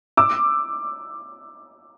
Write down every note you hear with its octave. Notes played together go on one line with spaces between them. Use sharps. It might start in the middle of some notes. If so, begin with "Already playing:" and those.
D6 E6